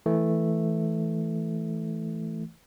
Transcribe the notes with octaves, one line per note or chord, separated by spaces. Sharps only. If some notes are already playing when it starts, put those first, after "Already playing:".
E3 A3